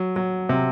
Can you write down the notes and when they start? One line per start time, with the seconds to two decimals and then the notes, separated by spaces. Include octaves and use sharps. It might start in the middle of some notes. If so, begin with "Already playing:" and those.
Already playing: F#3
0.16 F#3
0.49 C3